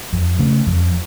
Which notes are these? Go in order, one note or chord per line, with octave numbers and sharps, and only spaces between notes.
F2
C#3 A3
F2